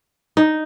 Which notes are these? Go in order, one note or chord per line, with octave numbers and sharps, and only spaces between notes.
D#4